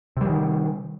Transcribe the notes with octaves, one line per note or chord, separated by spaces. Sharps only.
C3 D#3 E3 G3